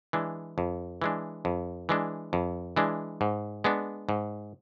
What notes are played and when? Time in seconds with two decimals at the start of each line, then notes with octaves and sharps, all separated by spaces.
0.13 E3 G#3 D4
0.58 F2
1.02 E3 G#3 D4
1.45 F2
1.89 E3 G#3 D4
2.33 F2
2.76 E3 G#3 D4
3.21 G#2
3.64 G#3 B3 D4
4.09 G#2